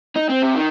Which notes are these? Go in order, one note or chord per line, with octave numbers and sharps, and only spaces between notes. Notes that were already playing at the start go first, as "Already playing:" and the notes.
D#4
C4
C3
D#3